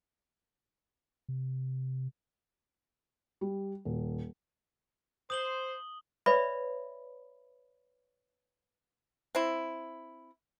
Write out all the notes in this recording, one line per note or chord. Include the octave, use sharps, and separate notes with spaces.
C3
G3
D#1
C5 D#6 F#7 G7
B4 C#5 D5 E5 B5
C4 E4